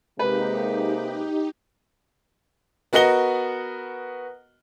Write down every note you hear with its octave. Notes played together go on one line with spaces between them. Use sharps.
C3 G#3 A#3 D#4 G4 B4
B3 F#4 A#4 D#5 F#5 G7